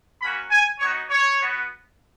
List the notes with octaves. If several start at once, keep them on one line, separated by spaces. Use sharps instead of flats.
A#3 C#4 F#4 B5
G#5
B3 D#4 F#4 C#5
C#5
B3 F#4